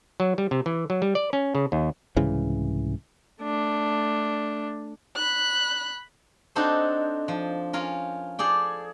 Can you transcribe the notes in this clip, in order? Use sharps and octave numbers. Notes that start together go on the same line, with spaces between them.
F#3
G3
C3
E3
F#3
G3
D5
C#4
C#3
D#2
C2 G#2 C#3 E3
A3 D4
B5 F#6
C4 D4 D#4 F#4 A4 C5
F3
C#4 F4 A#4
G#4 A4 D5 G5